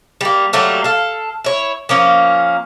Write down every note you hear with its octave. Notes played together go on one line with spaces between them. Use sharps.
G3 A#3
F#3 G3 A3 A#3
A4 F5
E4 C#5
F3 A#3 C#4